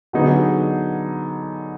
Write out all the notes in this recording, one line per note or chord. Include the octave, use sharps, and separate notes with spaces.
D3 F#3 B3 D#4 G#4